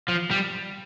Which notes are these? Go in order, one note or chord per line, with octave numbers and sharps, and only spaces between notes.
F3
G3